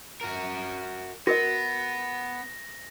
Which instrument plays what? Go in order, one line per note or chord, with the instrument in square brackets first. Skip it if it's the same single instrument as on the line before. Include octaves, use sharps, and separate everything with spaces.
[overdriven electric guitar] F#4 A#4
[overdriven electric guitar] B3 [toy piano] F#4 A#4 D#5 [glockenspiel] A#6